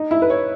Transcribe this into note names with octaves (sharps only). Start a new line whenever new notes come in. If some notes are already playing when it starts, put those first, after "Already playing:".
Already playing: D#4
E4
B4
C#5